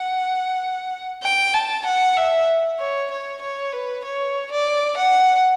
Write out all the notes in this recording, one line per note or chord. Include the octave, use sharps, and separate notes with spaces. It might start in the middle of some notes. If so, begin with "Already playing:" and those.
Already playing: F#5
G5
A5
F#5
E5
C#5
C#5
C#5
B4
C#5
D5
F#5